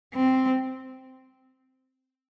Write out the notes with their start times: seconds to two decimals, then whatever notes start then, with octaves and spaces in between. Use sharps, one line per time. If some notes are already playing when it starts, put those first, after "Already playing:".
0.14 C4